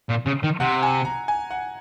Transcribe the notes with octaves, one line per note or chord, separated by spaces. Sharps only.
A#2
C#3
D#3
C3 F#5
G#5
A#5
G#5
F#5